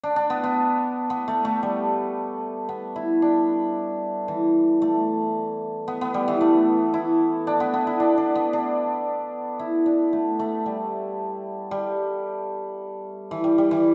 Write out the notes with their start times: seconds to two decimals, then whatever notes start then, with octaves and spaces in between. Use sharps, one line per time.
0.04 D4
0.16 D4
0.30 B3
0.44 B3
1.10 B3
1.28 A3
1.45 A3
1.63 G3
2.69 B3
2.96 E4
3.22 D4
4.28 E3
4.82 A3
5.88 B3
6.01 B3
6.14 G3
6.28 E3
6.41 A3
6.94 E4
7.47 D4
7.60 B3
7.74 B3
7.87 E4
8.00 D4
8.18 D4
8.35 B3
8.53 D4
9.60 E4
9.86 D4
10.13 A3
10.39 A3
10.66 G3
11.71 G3
13.31 E3
13.44 G3
13.58 G3
13.71 E3